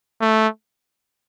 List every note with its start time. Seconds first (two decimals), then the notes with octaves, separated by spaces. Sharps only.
0.21 A3